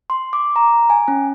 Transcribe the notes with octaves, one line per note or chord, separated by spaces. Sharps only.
C6
D6
A#5
G#5
C#4